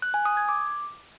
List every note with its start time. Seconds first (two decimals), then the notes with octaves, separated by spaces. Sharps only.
0.02 F#6
0.14 G#5
0.25 D#6
0.37 G#6
0.49 D6